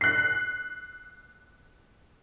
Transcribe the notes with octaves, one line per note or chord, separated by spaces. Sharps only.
F#6 C7